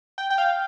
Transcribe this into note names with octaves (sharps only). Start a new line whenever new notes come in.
G5
G5
F5